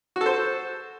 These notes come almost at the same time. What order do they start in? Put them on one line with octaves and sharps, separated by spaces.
F#4 A4 C5